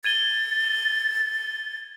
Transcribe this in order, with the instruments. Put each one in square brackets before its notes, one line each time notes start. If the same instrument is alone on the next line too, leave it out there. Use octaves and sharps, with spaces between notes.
[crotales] G#6 D#7 G7 [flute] A6